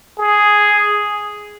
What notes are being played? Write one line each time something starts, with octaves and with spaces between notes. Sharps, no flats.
G#4